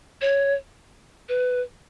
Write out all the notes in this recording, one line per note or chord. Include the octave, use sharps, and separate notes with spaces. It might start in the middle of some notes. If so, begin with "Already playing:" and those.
C#5
B4